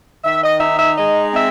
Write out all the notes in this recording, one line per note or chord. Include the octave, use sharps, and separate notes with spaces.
D#3 E5
D#5
D#4 E5
E5
G#3 D#5
C4 E5